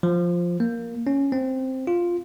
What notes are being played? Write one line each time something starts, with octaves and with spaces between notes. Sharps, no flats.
F3
A#3
C#4
C4
F4